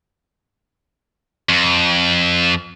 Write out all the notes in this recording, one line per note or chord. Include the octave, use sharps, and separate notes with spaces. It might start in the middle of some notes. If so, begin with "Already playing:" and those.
F2